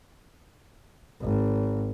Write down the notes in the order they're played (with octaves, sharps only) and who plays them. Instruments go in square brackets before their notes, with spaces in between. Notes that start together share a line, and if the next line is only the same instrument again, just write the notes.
[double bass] G#1